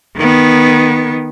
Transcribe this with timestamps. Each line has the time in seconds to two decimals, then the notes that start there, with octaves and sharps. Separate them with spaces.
0.17 D#3 B3